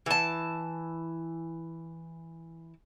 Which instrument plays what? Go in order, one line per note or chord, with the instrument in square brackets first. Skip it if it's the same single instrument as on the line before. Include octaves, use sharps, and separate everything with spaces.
[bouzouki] E3 A5